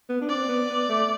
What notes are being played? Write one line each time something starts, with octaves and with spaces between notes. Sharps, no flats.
B3
D4
C4 D5
B3
B3
A3